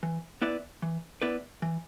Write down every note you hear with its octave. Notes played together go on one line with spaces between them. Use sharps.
E3
B3 E4 B4 D5
E3
B3 E4 B4 D5
E3